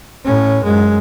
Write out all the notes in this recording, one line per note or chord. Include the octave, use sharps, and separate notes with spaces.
A2 C#4
F#2 G#3